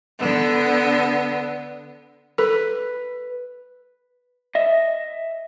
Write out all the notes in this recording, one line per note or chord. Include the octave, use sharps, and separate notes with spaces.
D3 B3
A4 B4
D#5 E5